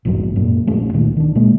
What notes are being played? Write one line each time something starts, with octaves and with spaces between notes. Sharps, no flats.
A#1 E2 G#2 F#3
F#2 A#2
F1 A#1 A3 C#4
C#2 A#2 D#3
D#3 D4
A#2 D3 G#3 A#3